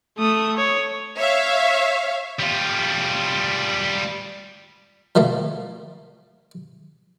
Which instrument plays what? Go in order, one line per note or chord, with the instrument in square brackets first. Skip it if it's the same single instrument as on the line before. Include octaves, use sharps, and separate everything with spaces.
[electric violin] A3 D#6
C#5
[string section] C#5 E5 F5
[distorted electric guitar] G3 F4
[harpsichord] F3 G3 A3 A#3